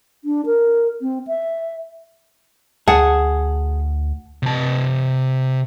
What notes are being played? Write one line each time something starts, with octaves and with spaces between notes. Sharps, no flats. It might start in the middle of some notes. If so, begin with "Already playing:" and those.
D4
A#4
C4
E5
D2 G#4 F#5 A5
C3 A5